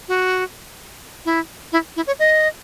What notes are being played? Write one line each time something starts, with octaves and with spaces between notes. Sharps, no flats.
F#4
E4
E4
E4
C#5
D#5